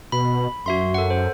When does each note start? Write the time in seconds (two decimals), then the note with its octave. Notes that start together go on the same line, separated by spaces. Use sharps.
0.12 B2 B5
0.66 F#2 F#4 E5 C6
0.94 A4 F#5
1.10 C5